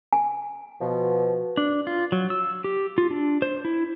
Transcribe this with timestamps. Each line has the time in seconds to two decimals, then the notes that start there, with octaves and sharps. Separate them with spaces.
0.13 G#5
0.81 B2 F3
1.57 D4
1.87 F4
2.12 F#3
2.30 E6
2.64 G4
2.98 F4
3.11 D4
3.42 C5
3.65 E4